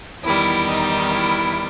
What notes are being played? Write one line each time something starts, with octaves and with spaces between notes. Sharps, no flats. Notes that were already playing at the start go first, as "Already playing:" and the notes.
E2 D#3 G3 E4
D#4
E4